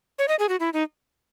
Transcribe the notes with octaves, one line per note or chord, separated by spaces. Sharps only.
C#5
D#5
G#4
F#4
E4
D#4